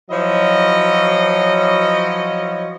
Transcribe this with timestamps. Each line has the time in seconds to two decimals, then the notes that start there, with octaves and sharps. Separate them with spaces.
0.10 F3 F#3 E4 C#5 D#5